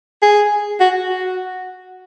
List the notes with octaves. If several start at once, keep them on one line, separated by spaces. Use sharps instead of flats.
G#4
F#4
F#4